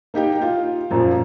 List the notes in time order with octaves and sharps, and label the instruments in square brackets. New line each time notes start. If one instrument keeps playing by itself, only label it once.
[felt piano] A#3 D#4 G4 G5
F4
F#2 A#2 F3